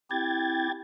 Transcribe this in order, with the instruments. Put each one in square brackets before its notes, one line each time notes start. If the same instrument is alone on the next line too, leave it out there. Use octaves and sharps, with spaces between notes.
[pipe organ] C4 E4 G4 [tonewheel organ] G5 G#6 A6